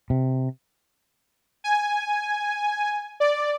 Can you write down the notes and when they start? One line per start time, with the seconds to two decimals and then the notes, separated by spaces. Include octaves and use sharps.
0.10 C3
1.64 G#5
3.20 D5